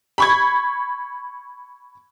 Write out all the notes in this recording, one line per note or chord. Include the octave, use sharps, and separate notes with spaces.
B5 C#6 G#6